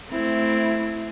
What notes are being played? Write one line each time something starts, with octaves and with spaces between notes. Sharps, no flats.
A3 C4 E4